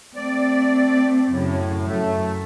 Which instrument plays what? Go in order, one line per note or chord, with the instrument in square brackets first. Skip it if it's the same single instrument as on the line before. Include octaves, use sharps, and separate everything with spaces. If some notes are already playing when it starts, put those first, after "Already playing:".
[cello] A3 C4 [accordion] D5
[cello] F#2 C#3 [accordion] A2
[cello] F#2 [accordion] A3